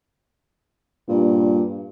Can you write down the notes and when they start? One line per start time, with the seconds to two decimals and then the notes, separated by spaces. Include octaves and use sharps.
1.08 G2 A#2